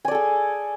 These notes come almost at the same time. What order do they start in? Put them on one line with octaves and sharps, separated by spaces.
G#5 D5 A4 G#4